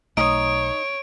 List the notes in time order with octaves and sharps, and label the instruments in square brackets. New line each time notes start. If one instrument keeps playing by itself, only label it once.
[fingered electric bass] B1 A3 [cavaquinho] D#4 D#6 [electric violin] C#5 [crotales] D7